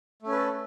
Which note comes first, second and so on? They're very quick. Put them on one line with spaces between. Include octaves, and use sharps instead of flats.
A3 C#4 B4 A4